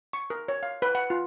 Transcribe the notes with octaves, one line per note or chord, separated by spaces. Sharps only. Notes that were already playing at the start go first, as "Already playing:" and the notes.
C#6
A#4
C#5
F5
B4
F#5
F4